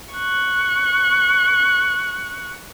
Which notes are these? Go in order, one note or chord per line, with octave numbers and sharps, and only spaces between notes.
C#6 F#6